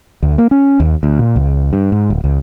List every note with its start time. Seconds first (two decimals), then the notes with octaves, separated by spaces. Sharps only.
0.23 D2
0.38 A#3
0.51 C#4
0.80 D#2
1.03 D2
1.19 A#2
1.36 C#2
1.73 G2
1.92 G#2
2.10 D1
2.24 C#2